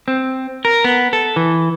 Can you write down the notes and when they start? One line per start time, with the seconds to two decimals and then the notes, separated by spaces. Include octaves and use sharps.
0.08 C4
0.65 A#4
0.84 B3
1.13 A4
1.36 E3